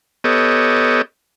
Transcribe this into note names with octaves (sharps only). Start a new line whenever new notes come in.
B3 G4 A4 C#5 D#5